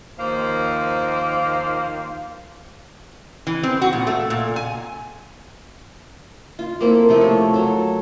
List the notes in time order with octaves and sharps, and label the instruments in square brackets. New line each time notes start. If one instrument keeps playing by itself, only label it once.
[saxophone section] D#2 F3 A#3 C5 F5
[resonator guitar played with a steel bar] E3
C4
F#4
A#2
A3
A#2
G#5
[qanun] F4
A#3 C4 E4 A4
C3 F3 A3
C#5
F#3 A4